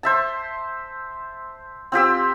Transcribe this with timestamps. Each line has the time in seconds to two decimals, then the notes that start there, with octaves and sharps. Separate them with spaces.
0.03 C5 E5 A5
1.92 C4 F4 G4 E6